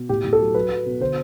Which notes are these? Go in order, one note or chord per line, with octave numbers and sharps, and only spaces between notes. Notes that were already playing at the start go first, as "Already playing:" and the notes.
Already playing: B2
A2 G4
A2
A4
F#3
F#3 B4
F#3
B2
D3 C5